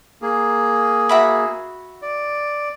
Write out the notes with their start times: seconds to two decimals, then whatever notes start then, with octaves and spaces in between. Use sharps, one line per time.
0.22 A#3 G#4
1.09 F#4 E5 B5
2.02 D5